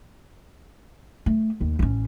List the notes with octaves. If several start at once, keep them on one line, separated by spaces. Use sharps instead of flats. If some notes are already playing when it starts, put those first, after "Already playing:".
A3
D#2
A1 C#4